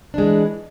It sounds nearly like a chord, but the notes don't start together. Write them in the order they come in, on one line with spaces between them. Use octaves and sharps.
D4 G#3 E3